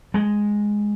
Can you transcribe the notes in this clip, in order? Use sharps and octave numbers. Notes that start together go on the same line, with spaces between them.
G#3